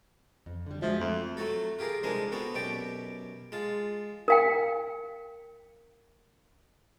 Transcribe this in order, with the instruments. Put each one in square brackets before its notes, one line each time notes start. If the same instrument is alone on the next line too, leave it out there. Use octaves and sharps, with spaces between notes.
[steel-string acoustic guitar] F2
D3 G3
[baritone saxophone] F3 [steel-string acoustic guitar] G#3 F#4 E5
[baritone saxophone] F2 [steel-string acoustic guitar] A3
[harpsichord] F#3 A3 F#4 A4
F4 G4 G#4 A#4
C2 F3 G#3 D4 A#4 G#5
B3 C4 F#4 A4
F#2 B2 G4 D5 G5
G#3 F4 A5
[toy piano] A#4 F5 G5